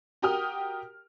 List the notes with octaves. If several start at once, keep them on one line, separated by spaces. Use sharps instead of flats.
F#4 G4 A#4 G5 D#6 F6